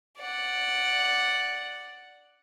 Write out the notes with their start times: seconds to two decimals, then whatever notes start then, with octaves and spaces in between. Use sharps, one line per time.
0.18 D5 F#5